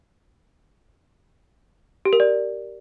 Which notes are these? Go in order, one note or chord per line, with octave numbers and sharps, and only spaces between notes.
G4
A#4
D5